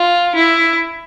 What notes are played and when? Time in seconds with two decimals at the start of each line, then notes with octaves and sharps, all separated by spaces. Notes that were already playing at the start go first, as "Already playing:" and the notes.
Already playing: F4
0.35 E4